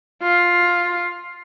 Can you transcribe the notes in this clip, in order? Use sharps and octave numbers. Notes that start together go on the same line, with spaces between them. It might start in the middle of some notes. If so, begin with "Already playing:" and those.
F4